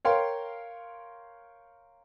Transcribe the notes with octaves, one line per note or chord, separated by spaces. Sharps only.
A#4 C#5 F5 G5 C6